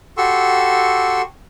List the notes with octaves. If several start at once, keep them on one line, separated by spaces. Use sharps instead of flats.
F#4 G4 A4 C6 C#6 E6